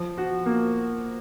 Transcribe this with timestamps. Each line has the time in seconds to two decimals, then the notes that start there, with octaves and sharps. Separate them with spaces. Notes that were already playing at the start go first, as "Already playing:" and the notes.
Already playing: F3
0.17 F#4
0.46 A#3